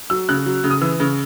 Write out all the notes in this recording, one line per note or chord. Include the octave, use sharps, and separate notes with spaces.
F#3 E6
C#3 F#6
F#3
C#3
D#6
E3 E6
C#3